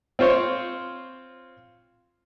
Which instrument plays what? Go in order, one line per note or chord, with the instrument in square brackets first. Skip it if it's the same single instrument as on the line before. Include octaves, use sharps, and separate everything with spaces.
[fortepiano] C4 F4 C5 C#5